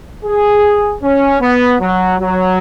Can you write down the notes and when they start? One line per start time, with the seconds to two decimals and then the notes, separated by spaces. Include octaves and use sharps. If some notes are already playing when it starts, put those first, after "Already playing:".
0.25 G#4
1.02 C#4
1.41 B3
1.80 F#3
2.20 F#3